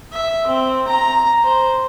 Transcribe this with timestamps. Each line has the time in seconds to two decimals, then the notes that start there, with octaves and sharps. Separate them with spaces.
0.12 E5
0.47 C4
0.88 A#5
1.44 C5